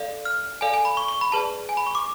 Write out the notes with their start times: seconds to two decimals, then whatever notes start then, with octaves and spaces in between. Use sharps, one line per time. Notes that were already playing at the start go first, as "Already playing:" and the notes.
Already playing: A4 D5 F5
0.25 F6
0.61 A4 D5 F5 G#5
0.74 G#5
0.85 B5
0.97 C#6
1.08 C#6
1.21 B5
1.32 G#4 B4 D5 A5
1.69 G#5
1.77 B5
1.87 C#6
1.95 D6